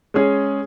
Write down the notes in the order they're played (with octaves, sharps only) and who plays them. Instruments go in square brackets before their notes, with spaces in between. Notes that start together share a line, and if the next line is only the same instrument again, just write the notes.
[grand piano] G#3 C#4 G#4